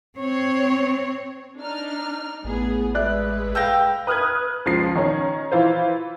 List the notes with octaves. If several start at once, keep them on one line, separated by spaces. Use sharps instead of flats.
C4 C#5
D4 D#4 F6
A1 A2 B3 G#4
G#3 B4 D5 E5 F#6
F5 G5 E6 G6 A#6
B4 D#6 F6 F#6 G#6
C#2 F3 C7
D#3 C#4
E3 E4 F4 C5